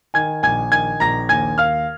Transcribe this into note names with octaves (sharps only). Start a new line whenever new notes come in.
D#3 G#5 G#6
A#1 G#5 G#6
D#3 G#5 G#6
A#1 A#5 A#6
D#2 G#5 G#6
D#2 F5 F6